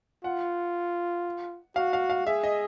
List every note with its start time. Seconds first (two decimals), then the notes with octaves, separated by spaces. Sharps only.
0.24 F4 F#5
1.76 F#4 F5
1.93 F5
2.10 F5
2.26 G#4 E5
2.43 D#5